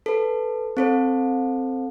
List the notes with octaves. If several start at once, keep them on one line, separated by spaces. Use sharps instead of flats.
A4 B4
C4 A4 C5